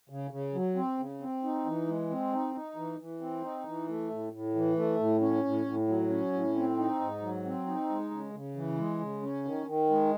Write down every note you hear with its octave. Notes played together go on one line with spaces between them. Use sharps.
C#3
C#3
F#3
C4
C#3
C4
D#4
E3
G#3
C4
D#4
D#4
E3
E3
C4
D#4
E3
A3
A2
A2
E3
A3
A2
C#4
A2
A2
F#3
C#4
A2
C4
D#4
G#2
F#3
C4
D#4
G#3
C#3
C#3
E3
G#3
C#3
C#4
D#3
D#3
G#3